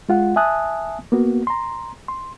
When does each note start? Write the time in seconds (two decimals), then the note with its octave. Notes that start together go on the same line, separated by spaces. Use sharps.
0.09 G#3 F4 F#5
0.36 E5 G#5 A5 D#6 F#6
1.12 A#3 B3 F#4
1.47 A#5 C6
2.08 C6